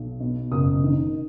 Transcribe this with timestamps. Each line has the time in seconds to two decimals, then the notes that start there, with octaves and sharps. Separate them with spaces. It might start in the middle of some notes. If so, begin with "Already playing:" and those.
Already playing: B1
0.20 B2
0.52 F#1 D#6
0.84 D#3